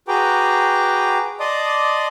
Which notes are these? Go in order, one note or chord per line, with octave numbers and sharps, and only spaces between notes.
F#4 G#4 B4 G5 A#5 D6
D5 D#5 A5 C6 D6 D#6